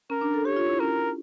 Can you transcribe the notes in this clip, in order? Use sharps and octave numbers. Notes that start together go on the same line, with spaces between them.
C#4 A#4
D4
A4
G4 C#5
F4
E4
C#4 A#4